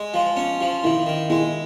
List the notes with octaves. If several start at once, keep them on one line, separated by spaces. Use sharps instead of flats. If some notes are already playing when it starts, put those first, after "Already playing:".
Already playing: G#3
F3
C#4
F3
D#3 E4
D#3
G#3 E4